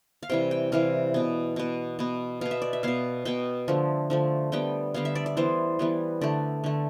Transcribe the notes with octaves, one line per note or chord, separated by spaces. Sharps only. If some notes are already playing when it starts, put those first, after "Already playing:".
F5
C3 E3 G3 G5
G5
C3 E3 G3 F5
B2 B3
B2 B3
B2 B3
B2 B3 F5
E5
D5
E5
B2 B3 F5
B2 B3 G5
D3 F3 A3
D3 F3 A3
D3 G3 B3 G5
D3 G3 B3 F5
E5
D5
D5
E3 G3 B3 C5
E3 G3 B3
D3 A3 D5
D3 A3